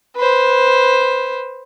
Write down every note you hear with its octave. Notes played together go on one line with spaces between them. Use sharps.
B4 C5